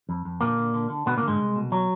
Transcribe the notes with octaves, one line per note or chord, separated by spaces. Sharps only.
F2
F2
A#2 D3 A#3
D3
D3
D3
B2 D3 B3
A#2 A#3
D3
G#2 G#3
C2
B2
F#3